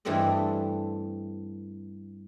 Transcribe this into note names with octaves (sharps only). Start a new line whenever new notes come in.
G2 E3 G3 A3 C4 D#5